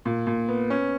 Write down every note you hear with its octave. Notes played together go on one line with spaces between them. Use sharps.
A#2
A#2
B3
C#4